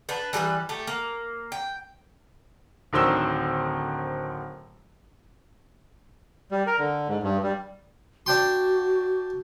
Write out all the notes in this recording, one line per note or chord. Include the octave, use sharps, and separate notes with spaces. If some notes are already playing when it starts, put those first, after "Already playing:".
D4 B4
E3 G3 A4 B4
A3 G4
A#3
G5
D1 D3 D#3 C5 E6 G7
G3
A#4
D3
G#2
G2
G3
D4 F#4 G5 C6